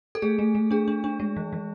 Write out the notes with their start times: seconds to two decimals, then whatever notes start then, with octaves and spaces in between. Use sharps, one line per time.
0.15 A4
0.22 A3 G#4
0.39 A3
0.55 A3
0.71 D4 G#4
0.88 D4
1.04 D4
1.20 G#3
1.36 E3
1.53 E3